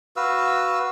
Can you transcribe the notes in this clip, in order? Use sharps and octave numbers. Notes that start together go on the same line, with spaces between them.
F#4 B4 F5 E6